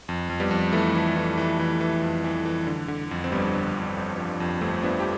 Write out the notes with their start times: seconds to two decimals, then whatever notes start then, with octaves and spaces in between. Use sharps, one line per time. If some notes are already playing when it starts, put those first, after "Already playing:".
0.09 F2
0.30 F2
0.40 G3 B3
0.51 F2
0.73 E3 A3
0.95 E3
1.16 E3
1.37 E3
1.59 E3
1.81 E3
2.02 F2
2.24 E3
2.45 E3
2.67 D3
2.88 D3
3.11 F2
3.24 C4
3.32 G1 G3 B3
3.53 D3
3.75 F2
3.97 G1
4.18 F3
4.40 F2
4.61 G1 A3 C4
4.83 F3 B3 D4
5.00 G4